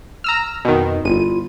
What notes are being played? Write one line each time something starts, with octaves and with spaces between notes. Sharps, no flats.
A#5 E6 F6
F2 B2 D#3
G1 E4 F4 D#7